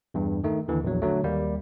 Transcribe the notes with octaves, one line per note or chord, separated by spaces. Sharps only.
E2 G2
D#3 A3 D#4
D#2 D3 E3
A#1 E2 F#3
D3 F#3 A3
D#2 G3 A#3